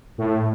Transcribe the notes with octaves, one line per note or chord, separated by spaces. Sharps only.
A2